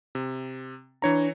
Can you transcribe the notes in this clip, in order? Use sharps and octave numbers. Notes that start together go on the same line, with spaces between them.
C3
E3 D4 C#5 A#5